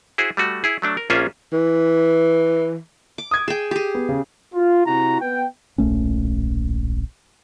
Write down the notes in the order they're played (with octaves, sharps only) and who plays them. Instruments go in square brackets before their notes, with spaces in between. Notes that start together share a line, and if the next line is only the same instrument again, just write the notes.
[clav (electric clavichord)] E4 F#4 G#4 C5
G3 A3 F#4
E4 G#4
F#3 A3 D4
A#4
A#1 A#3 C#4 F4 G#4 E5
[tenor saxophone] E3
[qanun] D6
[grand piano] D#6 G#6
[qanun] G#4 G5 [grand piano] E7
[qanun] G4 G#4
[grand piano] B3
C#3
[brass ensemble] F4
C3 E4 F#4 A#5
B3 G5
[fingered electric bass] D1 A#1 A3 C#4